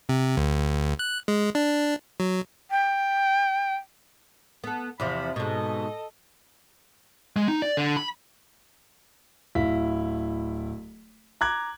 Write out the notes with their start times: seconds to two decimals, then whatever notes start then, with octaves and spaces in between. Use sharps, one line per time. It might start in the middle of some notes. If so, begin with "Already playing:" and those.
0.09 C3
0.37 D2
0.99 F#6
1.28 G#3
1.55 D4
2.20 F#3
2.71 G5
4.64 B3 A4
5.00 E2 C3 F3 B5
5.36 G#2 B2 A4 D#5
7.36 G#3
7.48 D#4
7.62 D5
7.77 D3
7.97 B5
9.55 D1 E4 F5 B6
11.41 A#5 D6 F#6 G#6